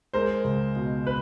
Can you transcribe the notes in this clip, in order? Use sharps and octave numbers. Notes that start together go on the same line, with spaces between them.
G#3 A#4 C5
C#2
B2
B4